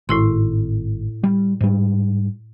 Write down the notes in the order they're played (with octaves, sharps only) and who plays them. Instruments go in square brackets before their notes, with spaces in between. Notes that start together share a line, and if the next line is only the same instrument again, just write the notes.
[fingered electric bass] G#1 [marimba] A2 E4 C6
[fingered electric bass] G3
G#2 G3